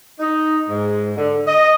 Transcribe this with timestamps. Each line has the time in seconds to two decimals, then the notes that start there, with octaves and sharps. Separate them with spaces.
0.19 D#4
0.69 G#2
1.18 D3
1.46 D#5